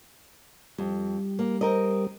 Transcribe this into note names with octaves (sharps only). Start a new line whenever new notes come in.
F2 G3
A#3
C4 A#4 D#5